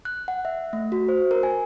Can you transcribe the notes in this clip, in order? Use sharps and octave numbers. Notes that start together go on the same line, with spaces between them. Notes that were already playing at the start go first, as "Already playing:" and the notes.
F#6
F#5
E5
A3
F#4
C5
A#4
G#5